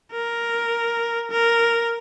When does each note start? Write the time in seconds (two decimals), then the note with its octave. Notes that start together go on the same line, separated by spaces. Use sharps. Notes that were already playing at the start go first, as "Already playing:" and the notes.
0.12 A#4
1.31 A#4